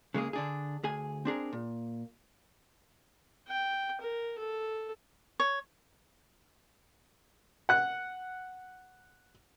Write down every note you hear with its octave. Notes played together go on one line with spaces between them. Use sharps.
C#3 G#3 A#3 G#4
D3 D4 G#4
D2 G#4 G#5
C4 D4 G#4 A#4
A#2
G5
A#4
A4
C#5
F#5 F#6